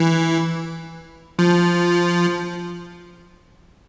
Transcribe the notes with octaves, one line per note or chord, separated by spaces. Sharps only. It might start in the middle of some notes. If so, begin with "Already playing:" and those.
Already playing: E3
F3